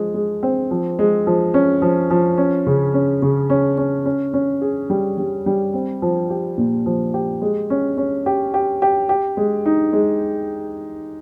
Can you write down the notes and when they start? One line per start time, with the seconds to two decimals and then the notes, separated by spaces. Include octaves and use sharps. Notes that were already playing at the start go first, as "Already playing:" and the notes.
Already playing: F3 G#3
0.14 G#3
0.43 C4
0.71 F3
0.99 G#3
1.27 F3
1.54 C#4
1.82 F3
2.11 F3
2.38 C#4
2.67 C#3
2.94 C#4
3.22 C#3
3.50 C#4
3.78 C#4
4.06 C#4
4.34 C#4
4.62 G#4
4.90 G3
5.18 G3
5.46 G3
5.74 C4
6.02 F3
6.30 G4
6.58 A#2
6.86 F3
7.14 G4
7.42 G#3
7.70 C#4
7.97 C#4
8.26 G4
8.54 G4
8.82 G4
9.09 G4
9.37 G#3
9.66 D#4
9.93 G#3